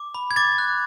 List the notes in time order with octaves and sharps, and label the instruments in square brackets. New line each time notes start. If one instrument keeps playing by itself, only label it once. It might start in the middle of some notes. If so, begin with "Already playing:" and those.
Already playing: [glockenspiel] D6
B5
G#6
D6 A6
F#6